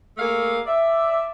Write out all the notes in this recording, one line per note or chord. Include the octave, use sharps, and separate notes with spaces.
A3 A#3 G#4 F5
D5 E5